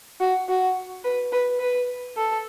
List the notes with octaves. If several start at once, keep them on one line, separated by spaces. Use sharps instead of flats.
F#4
F#4
B4
B4
B4
A4